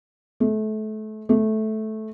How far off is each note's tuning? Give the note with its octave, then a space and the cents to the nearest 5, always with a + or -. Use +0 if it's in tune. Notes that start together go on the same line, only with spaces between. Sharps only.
A3 -30
A3 -15